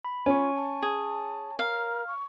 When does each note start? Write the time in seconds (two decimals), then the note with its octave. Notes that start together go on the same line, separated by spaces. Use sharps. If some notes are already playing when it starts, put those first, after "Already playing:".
0.05 B5
0.26 C#4 F4 G#5 C#6
0.55 A5
0.82 G#4
1.59 A#4 F5
2.07 C#6